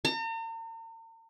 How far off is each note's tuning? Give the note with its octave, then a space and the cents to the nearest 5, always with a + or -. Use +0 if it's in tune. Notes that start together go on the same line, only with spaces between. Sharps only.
A#5 -45